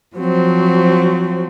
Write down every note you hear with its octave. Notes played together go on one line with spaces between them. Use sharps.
F3 F#3 C4